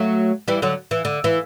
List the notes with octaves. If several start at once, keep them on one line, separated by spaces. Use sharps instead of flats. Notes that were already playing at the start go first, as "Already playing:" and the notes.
Already playing: F#3 A3
E3 G3
D3 F#3
E3
D3
E3